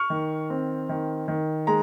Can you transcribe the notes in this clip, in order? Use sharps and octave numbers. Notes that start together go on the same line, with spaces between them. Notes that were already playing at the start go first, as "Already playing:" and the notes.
Already playing: C#6 F6
D#3
C4
D#3
D#3
G#3 A#5